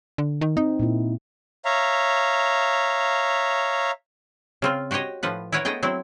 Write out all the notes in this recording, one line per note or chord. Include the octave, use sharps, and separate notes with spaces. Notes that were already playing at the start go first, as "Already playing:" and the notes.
D3
D#3
C4 D#4
A#2 A#3 E4
C#5 E5 F5 A#5
C#3 C4 F4
F#4 G4 C5 C#5 D#5
A2 F3 B4 F#5
E4 A#4 B4 C#5 F#5
A3 B3 G#4 D#5 G5
F#3 C4 E4